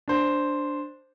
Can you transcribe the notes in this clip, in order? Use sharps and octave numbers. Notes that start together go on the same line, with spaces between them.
D4 C5